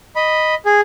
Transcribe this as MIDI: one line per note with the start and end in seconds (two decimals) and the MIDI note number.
0.16 0.55 75
0.16 0.55 83
0.66 0.81 68